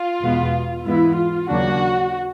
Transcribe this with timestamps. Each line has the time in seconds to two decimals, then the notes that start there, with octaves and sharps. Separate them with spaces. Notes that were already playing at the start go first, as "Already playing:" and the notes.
Already playing: F4
0.21 E2 B2 G#3 B3
0.84 G#2 E3 G#3 B3 E4
1.17 F4
1.49 D#2 C#3 F#3 A#3 D4 F#4